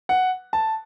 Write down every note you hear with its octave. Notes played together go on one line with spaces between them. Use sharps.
F#5
A5